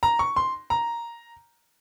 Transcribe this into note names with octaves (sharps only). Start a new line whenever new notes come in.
A#5
C#6
C6
A#5